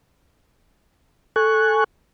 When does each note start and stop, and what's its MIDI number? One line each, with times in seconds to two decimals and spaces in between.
1.36 1.84 69
1.36 1.84 80
1.36 1.84 85
1.36 1.84 90